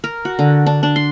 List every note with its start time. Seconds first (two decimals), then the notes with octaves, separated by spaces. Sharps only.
0.04 A#4
0.25 F#4
0.39 D3
0.66 D4
0.83 D4
0.96 C6